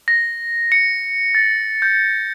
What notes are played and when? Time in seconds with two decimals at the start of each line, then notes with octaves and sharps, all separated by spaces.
0.08 A#6
0.72 C#7
1.35 A6
1.82 G6